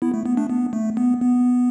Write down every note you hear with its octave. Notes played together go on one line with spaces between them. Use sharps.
B3 E4
A3
B3
A3 D4
B3
A3
B3
B3